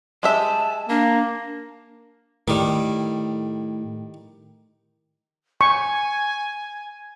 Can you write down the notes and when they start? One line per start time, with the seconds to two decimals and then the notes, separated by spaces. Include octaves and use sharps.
0.23 G#3 G4 E5 A5
0.90 A#3 D4
2.48 A2 D#3 G3
5.61 G#5 C#6